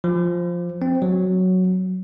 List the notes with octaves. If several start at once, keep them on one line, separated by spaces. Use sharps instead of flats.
F3
C4
F#3